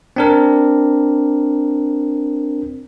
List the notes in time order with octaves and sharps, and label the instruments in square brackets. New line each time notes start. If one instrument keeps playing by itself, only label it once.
[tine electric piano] C4 D4 A#4